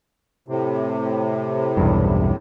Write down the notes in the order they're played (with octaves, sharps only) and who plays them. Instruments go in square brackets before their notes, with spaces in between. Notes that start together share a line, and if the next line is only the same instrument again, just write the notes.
[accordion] A2 C3
[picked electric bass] B1 E2 G2